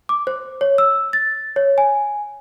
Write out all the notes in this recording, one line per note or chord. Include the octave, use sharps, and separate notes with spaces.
D6
C5
C#5
E6
A6
C#5
G#5